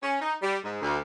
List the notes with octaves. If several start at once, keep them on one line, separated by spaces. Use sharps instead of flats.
C#4
D#4
G3
G#2
D2